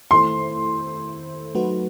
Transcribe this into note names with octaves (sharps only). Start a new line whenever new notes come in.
D#3 A3 E4 A4 C5 C6
F#3 A3 D#4 F#4 B4